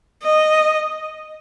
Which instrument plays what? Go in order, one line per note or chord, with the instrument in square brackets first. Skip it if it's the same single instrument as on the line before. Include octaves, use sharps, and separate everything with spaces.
[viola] D#5